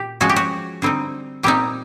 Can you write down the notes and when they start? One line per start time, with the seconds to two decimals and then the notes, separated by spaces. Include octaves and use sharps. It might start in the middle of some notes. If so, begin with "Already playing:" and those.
Already playing: A#2 G4
0.20 F3 G#3 C#4 F#4
0.29 G4
0.36 F#4
0.82 D3 G3 C4 D#4
1.43 A#2 G3 C4 D#4 G4